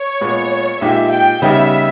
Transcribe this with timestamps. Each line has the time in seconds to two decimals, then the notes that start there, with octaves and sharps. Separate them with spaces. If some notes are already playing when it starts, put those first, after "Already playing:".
Already playing: C#5
0.21 A#2 G#3 B3
0.81 A#2 G#3 D#4 G4 E5
1.11 G5
1.42 C#3 G3 B3 D#4 G4 E5